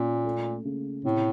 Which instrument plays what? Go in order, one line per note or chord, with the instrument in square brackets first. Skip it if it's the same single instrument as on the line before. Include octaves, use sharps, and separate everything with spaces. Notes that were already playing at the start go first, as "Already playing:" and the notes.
Already playing: [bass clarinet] A#2 [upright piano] A#3 C#4
[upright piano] A3
C#3
[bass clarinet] A2 [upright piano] C3